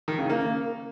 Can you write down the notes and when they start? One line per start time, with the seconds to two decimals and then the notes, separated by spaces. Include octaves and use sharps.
0.08 D#3
0.19 C#3
0.30 A#3